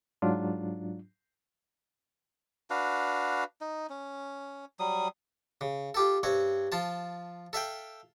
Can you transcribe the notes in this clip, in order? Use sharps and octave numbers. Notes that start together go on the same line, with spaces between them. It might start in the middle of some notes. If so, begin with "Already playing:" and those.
G#2 F#3 D4 F4
D4 F#4 B4 F5
D#4
C#4
F#3 G3 D#6
C#3
F4 G4 A4
G2 C4 C#5
F3 F4 A5
A4 E5 F5 G5